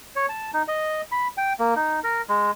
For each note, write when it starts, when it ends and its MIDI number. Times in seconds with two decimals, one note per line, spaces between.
0.16 0.26 73
0.29 0.51 81
0.54 0.62 63
0.68 1.02 75
1.12 1.28 83
1.37 1.53 79
1.59 1.74 58
1.76 2.00 63
2.04 2.22 70
2.29 2.51 56